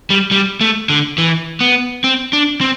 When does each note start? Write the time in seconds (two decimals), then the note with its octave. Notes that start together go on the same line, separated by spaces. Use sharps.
0.10 G3
0.31 G3
0.61 A3
0.89 D3
1.18 E3
1.60 B3
2.04 C4
2.33 D4
2.61 C4